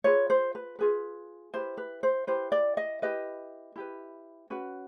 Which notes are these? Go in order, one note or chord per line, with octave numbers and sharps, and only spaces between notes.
F4 G#4 B4 C#5
C5
B4
F4 G#4 B4
E4 G4 B4 C5
B4
C5
E4 G4 B4 C5
D5
D#5
E4 G4 B4 D#5
E4 G4 B4
C#4 F#4 B4